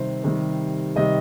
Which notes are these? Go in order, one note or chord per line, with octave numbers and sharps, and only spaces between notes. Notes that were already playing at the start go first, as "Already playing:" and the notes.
Already playing: C3 D#3 G3 C5
C3 D#3 G3
C3 D#3 G3 D#5